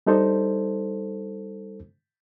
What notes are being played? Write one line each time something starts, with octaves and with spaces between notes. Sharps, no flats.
G3 D4 D#4 A4 C5